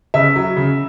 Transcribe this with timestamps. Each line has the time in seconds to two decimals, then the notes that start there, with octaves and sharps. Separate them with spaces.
0.14 C#3 E5
0.36 F#3
0.57 C#3